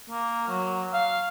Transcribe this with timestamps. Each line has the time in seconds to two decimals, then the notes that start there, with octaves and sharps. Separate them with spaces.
0.10 A#3
0.48 F#3
0.93 F5